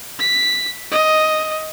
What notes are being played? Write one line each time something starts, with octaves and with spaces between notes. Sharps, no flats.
B6
D#5